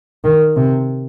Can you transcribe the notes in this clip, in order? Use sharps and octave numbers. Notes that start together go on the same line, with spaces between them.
D#3
C3